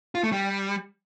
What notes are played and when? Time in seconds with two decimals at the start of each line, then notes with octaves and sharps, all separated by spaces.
0.15 F4
0.23 A3
0.32 G3